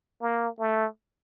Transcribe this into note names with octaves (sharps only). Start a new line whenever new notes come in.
A#3
A3